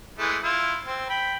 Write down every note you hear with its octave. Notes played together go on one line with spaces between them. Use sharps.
E3 G#3 A3
E4 F4
C4
G5 B5